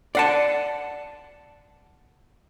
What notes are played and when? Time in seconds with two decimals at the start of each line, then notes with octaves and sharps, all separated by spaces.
0.15 D5 F#5 A5